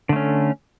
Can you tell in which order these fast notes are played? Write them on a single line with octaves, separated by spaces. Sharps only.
D3 A3 C#4